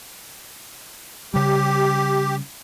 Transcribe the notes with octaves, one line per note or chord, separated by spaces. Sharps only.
C#3 G3 G4